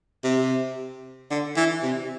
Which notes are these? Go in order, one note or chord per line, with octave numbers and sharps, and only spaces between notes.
C3
D3
E3
C3